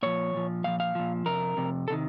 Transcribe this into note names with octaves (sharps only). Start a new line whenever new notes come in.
A#2 F3 C#5
A#2 F3
A#2 F3 F5
F5
A#2 F3
F2 C3 A#4
F2 C3
C3 D#3 A4